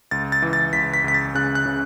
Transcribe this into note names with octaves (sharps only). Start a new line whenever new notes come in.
C#2 A6
A6
E3
A6
C#2 B6
B6
C#2 B6
A6
C#3 F#6
F#6
C#3